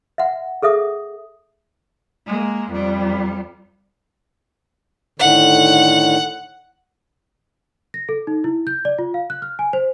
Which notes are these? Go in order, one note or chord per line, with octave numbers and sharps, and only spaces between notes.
E5 F#5
G#4 A4 E5 D#6
G#3 A#3
F2 G3
A2 D3 D#3 F#5
A#6
A4
D#4
E4
G6
D5
F4
F5
F#6
F6
G#5
C5